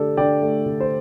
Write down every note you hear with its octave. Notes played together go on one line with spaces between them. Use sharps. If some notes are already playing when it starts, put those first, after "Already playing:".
Already playing: D3 A3 D4 G4 A4 D5
D3 D5 G5
A3
D3
C5